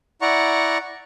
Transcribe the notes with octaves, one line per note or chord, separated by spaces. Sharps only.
E4 D5 F#5 A#5 C#6